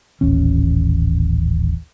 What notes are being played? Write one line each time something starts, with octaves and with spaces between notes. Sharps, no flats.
D#1 A1 C#4